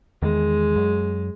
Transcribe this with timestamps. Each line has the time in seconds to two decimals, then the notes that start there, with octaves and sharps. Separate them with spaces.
0.22 E2 D#3 G#3
0.76 F#2